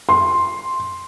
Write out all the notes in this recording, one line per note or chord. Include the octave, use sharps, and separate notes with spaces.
C6